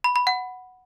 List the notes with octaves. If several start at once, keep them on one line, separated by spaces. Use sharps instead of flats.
B5
B5
F#5